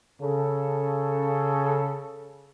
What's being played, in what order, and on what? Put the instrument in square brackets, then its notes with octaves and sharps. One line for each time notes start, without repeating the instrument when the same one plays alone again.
[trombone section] C#3 A4